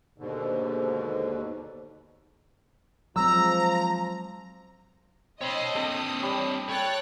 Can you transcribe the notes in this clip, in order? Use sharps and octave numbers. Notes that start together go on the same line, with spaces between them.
D#2 G#2 B2 D3
F3 F#3 G#3 C4 A#5 E6
C4 C#5 D#5 A5 B5
C4 D4 A4 A5 D#6
G3 C#5
A4 C#5 G5 F#6 A6